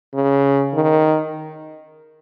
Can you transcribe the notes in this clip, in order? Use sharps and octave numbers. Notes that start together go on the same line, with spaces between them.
C#3
D#3